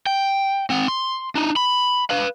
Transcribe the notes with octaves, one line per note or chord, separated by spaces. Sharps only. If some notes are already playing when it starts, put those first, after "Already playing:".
G5
C4 F#5
C6
D4 D#4
B5
B4 F5